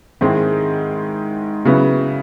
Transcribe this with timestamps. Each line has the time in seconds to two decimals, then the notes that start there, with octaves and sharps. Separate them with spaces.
0.21 G#2 D#3 G#3 C4 E4
1.65 C#3 F#3 B3 E4